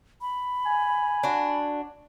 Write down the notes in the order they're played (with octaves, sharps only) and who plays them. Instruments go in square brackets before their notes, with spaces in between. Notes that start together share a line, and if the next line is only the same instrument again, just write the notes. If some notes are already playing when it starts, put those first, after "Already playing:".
[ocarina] B5
[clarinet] G#5
[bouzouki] D4 F#4